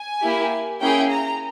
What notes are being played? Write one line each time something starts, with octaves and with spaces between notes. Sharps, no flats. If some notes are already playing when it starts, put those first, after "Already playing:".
Already playing: G#5
A#3 E4 G4
A#3 C#4 E4 G#4 G5
A#5